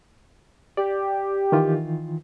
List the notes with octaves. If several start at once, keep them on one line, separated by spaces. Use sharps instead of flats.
G4 D5
D#3 E3 F4